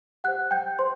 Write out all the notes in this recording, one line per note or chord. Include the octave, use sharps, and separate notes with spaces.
G4 C5 F#5 F#6
G5 G6
C5 C6